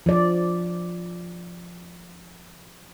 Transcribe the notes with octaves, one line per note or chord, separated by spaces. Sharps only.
F3 D5